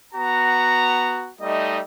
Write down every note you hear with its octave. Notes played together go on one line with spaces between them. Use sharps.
B3 F#4 A#5
G3 A3 D#4 D#5